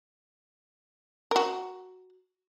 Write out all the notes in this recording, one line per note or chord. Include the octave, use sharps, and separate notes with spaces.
F#4 A#4